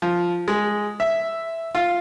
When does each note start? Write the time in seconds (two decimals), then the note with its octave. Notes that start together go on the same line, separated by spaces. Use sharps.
0.02 F3
0.48 G#3
1.00 E5
1.75 F4